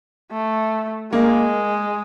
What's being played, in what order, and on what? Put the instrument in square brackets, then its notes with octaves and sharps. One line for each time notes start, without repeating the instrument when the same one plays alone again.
[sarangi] A3
[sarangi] G#3 [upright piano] A#3